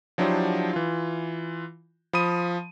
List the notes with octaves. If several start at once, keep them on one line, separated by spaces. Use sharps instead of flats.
F3 F#3 D4 E4 G4 C5
E3 F4
F3 B5 D#6 D#7